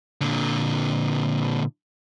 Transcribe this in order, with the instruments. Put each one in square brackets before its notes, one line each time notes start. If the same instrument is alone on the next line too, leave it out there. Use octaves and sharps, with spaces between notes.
[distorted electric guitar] A#2 D3